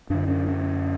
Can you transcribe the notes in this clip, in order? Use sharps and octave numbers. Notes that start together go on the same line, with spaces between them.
F#2 D3 D4
C#4
C#4